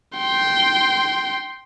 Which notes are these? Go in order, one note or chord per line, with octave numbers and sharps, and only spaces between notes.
G5 C6